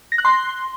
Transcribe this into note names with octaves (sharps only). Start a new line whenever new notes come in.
A#6
F#6
C6